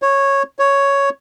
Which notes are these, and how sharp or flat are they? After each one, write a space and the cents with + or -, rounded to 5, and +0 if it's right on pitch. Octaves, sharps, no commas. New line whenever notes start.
C#5 -10
C#5 +5